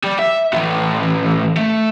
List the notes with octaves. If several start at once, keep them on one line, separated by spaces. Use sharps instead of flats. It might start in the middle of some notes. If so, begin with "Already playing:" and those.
G3
E5
A2 E3
A3